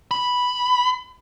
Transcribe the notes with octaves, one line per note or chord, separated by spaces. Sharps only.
B5